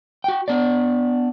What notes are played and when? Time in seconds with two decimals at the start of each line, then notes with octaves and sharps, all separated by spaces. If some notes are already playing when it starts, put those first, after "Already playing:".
0.24 F#4 G5
0.48 B3 D4 D5